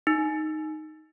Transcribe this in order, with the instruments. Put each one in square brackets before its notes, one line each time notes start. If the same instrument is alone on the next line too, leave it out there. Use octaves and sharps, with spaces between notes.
[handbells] D#4